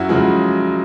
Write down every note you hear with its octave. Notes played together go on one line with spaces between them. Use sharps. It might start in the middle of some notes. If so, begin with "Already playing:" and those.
Already playing: F#2 E4 F#4
C#3 F3 G#3